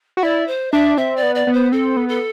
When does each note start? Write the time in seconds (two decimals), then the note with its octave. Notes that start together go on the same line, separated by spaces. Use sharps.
0.17 F#4
0.23 E4 D5
0.47 C5
0.72 D4 E5
0.97 C4 E5
1.16 D5
1.23 B3
1.35 D5
1.47 B3
1.53 C5
1.72 C4 A4
1.97 B3
2.09 A4